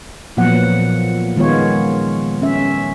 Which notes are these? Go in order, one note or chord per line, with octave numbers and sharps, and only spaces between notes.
A#2 F3 F#3 B3 F#5
D#3 G#3 B3 F4 C#5
C#4 E5